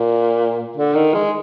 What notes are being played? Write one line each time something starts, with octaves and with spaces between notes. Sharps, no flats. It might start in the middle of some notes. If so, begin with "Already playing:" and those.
Already playing: A#2
D3
D#3
G#3